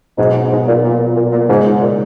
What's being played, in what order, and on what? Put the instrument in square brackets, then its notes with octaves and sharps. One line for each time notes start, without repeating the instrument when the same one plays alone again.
[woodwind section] G#2 [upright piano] B2 F#3 B3 D#4
[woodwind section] G#2
A#2
A#2
A#2
A#2
[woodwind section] G#2 [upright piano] C#3 G#3 C#4
[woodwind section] A#2